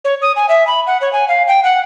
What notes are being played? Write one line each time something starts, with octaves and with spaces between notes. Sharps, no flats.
C#5
D#6
G#5
E5
B5
F#5
C#5
G#5
F5
G5
F#5